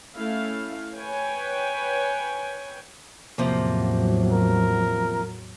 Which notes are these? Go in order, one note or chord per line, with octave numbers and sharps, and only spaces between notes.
A3 C#4 E4 F5
B4 C#5 G5 G#5
E2 A2 C3 F3 F#3 A#3
A#4